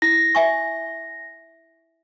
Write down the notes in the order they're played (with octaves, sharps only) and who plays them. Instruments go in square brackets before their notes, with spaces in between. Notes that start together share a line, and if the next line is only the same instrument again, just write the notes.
[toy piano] E4 [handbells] A#6
[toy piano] E5 G#5 C#6